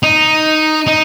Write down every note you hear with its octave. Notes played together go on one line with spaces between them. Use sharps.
D#4
D#4